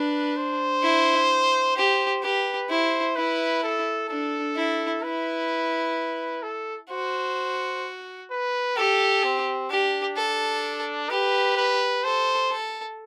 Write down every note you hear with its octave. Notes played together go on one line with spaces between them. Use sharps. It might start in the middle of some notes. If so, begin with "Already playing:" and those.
Already playing: D4 B4
C5
E4
G4 C5
G4 B4
E4 C5
E4 B4
A4
D4 A4
E4
E4 B4
A4
F#4 C5
B4
G4 A4
C4
D4 G4
A4
G4 B4
B4
A4 C5
A4